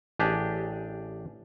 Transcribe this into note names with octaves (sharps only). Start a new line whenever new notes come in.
A1 D4 G4 G#4